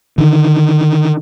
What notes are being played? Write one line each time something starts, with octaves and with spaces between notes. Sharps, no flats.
D3 D#3